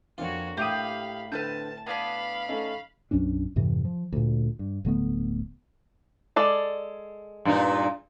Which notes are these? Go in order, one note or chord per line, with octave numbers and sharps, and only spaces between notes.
F2 A#3 D4 F4 F#4 C#5
A2 G4 F5 B5 D#6
D3 C4 B4 A5 F6 G6
B3 D4 F5 A5 B5 G#6 B6
A3 C#4 D#4
B1 F#2 C#4 D4
F2 G#2 C3 E3
F3
D2 A#2
G2
D1 D3 A3 B3
G#3 A4 D5
G2 A#2 D#4